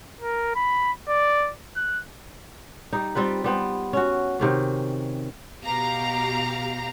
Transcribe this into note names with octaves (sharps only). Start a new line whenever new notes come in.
A#4
B5
D5
F#6
G3 D#4
G3 C4 F4 B4
G3 B3 C5
C#4 F#4
C3 D#3 C#4
B2 G4 F5 A#5